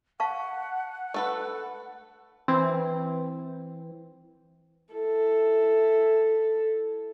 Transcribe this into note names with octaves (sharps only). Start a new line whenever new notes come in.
F5 F#5 A5 C#6
A3 A4 B4
E3 C4
E4 A4